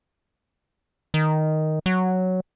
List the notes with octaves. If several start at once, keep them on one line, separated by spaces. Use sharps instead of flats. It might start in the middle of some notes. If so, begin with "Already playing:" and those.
D#3
F#3